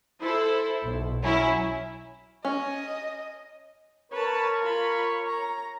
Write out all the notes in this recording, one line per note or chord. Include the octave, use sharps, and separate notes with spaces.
E4 A4 C5
B1
F#3 C#4 E4
C#4 D#5
A#4 B4 C#5 A5
F4 B5
A#5